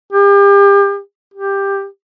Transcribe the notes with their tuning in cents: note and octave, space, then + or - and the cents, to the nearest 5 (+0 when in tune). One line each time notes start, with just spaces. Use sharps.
G4 +35
G4 +10